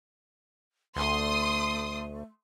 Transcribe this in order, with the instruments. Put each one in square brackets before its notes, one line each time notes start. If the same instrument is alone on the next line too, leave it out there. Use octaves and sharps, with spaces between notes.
[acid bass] D2 [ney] A3 [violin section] C6 D#6